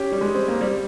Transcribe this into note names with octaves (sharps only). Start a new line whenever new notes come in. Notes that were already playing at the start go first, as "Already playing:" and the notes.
Already playing: C#4 G4
G3
G#3
C4
A#3
G3